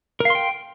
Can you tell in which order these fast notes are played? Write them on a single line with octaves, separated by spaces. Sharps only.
A#4 F5 C6 G5